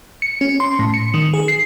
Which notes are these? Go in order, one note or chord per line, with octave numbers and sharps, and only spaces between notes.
C#7
C#4
C6
A2
C#7
D#3
G#4
C7